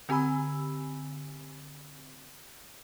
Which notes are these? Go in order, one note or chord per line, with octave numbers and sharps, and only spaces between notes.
D3 C4 G4 G#5 B5 E6